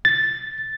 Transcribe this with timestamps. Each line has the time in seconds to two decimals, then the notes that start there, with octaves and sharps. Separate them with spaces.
0.05 A6